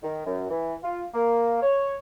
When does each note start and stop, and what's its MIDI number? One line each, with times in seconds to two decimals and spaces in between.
0.02 0.21 51
0.25 0.46 42
0.50 0.74 52
0.83 1.03 65
1.14 1.60 58
1.62 1.94 73